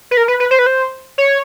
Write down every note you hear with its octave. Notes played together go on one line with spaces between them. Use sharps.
B4
A#4
B4
B4
C5
B4
C5
C#5